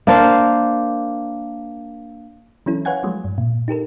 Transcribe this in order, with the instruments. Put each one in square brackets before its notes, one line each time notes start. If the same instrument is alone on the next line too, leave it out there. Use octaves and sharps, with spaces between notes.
[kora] A#3 D4 C5 F5
[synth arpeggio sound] E3 F#3 C#4 E4 A4
B4 C#5 F5 F#5 G#5 G#6
F3 F#3 G#3 A3
G2
A#2
D#4 G4 A4 A#4